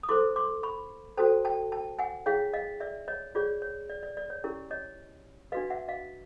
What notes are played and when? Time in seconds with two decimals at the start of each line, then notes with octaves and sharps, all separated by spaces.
0.03 D#6
0.09 E4 A4 C5 C6 D6
0.36 C6 D6
0.63 B5 C#6
1.17 F#4 A4 C5 G5 A5
1.45 G5 A5
1.72 G5 A5
1.99 F#5 G#5
2.26 E4 G#4 C#5 F5 G5
2.54 D#5 F5
2.80 D5 E5
3.08 C#5 D#5
3.35 F4 G#4 C#5 D5
3.62 C#5
3.89 D5
4.03 D5
4.17 D5
4.30 C#5
4.44 C#4 E4 G4 A#4
4.71 C#5 D#5
5.52 D4 F#4 B4 D#5 F5
5.70 E5 F#5
5.88 D#5 F5